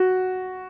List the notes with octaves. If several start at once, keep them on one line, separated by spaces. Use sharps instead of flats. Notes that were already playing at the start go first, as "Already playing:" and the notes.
Already playing: F#4